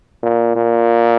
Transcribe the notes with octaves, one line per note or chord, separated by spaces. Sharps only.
A#2
A#2